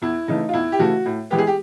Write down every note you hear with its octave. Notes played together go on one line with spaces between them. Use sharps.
E2 E4
C#3 E3 A3 D#4
F4
E2 E4
G4
C#3 E3 A3 F#4
A2
E3 G#3 B3 G4
G#4
G4